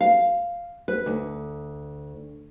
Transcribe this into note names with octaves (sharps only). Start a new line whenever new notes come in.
F5
B4
D2